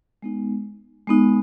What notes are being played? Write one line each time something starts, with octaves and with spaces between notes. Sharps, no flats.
G#3 B3 D#4
G#3 B3 D#4